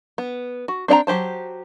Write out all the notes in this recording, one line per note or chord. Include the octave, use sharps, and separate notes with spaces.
B3
F#4
C4 D4 D#5 G5 A#5
F#3 G4 C5 A5